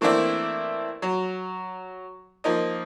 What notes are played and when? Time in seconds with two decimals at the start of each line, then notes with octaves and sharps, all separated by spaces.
0.01 E3 A3 A#3 C4 D4 E4
1.02 F#3
2.44 F3 A#3 D#4